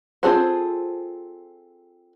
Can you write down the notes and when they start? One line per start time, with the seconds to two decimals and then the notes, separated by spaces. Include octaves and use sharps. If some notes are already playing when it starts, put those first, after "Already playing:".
0.23 C4 F4 G#4 A4 C5